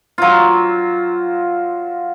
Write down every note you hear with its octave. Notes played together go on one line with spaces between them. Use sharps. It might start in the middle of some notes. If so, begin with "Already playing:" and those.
F#3 F4